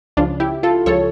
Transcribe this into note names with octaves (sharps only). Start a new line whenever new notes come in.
C#2 C#3 F3 D4 F4
E4 G4
F4 A4
C#2 C#3 F3 A4 C#5